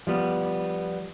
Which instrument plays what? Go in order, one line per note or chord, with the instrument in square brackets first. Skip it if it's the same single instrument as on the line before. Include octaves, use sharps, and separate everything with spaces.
[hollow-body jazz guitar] F3 G3 B3